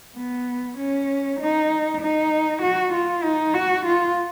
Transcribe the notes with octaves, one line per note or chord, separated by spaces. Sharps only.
B3
C#4
D#4
D#4
F#4
F4
D#4
F#4
F4